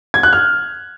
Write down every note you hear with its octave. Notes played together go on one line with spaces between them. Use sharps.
G#6
F#6
F6